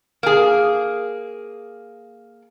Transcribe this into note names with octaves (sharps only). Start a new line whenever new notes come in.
A#3 G#4